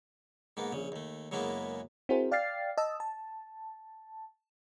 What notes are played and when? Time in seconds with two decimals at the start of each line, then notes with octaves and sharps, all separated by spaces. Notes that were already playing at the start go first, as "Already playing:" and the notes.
0.57 G#2 A#3 B3
0.72 A#1 C#3
0.92 D#2 A3
1.31 F#2 C#3 G#3 A#3 B3 E4
2.09 C4 E4 F#4 G#4 A#4 C5
2.31 D5 F5 G5 F6 A6 C7
2.78 D#5 A5 E6
3.00 A5